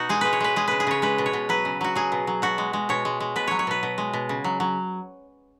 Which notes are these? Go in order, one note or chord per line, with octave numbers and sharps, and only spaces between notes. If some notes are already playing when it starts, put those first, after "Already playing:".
Already playing: B2 D#4 F#4
G#3 G#4
G#3 B4
C#5
G#3 B4
G#3 G#4
C#3 B4
G#4
C#3 C#5
G#3 B4
B2
C#5
B2
F#3 B4
C#3
F#3 F#4
F#3 G#4
B2
F#3
B2 F#4
G#3
G#3
B2 C#5
G#3
G#3
B2 B4
F#3 C#5
C#5
B2 B4
B2
G#3
B2
C#3
F#3
F#3